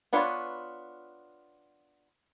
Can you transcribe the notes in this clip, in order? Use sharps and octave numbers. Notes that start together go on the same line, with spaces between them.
B3 D4 F4 B4 C#5